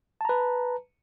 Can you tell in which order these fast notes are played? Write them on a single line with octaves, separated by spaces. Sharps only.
A5 A#5 B4